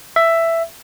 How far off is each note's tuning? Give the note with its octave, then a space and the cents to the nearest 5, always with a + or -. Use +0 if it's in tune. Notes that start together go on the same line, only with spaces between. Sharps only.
E5 +10